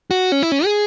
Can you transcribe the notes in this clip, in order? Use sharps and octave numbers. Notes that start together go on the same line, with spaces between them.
F#4
C#4
E4
C#4
G#4